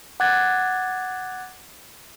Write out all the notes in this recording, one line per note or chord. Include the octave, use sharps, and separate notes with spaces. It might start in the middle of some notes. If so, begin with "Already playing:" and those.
F#5 D6 F#6 G#6 A6